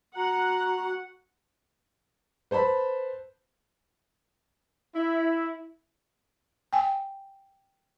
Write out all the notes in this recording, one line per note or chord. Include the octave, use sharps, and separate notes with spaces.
F#4 F#5 A#5
B4 C5 A5 B5
E4
G5 G#5